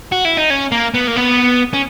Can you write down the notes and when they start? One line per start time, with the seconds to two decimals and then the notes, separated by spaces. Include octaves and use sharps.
0.12 F#4
0.25 E4
0.37 D#4
0.50 C#4
0.72 A#3
0.94 B3
1.07 A#3
1.16 B3
1.74 C#4